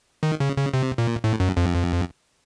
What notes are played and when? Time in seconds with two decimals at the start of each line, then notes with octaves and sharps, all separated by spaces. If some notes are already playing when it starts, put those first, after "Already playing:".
0.23 D#3
0.40 C#3
0.57 C#3
0.74 C3
0.98 A#2
1.24 A2
1.40 F#2
1.57 F2